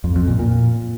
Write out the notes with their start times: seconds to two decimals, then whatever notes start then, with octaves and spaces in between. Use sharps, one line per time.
0.04 F2
0.16 F2
0.27 A#2
0.39 A#2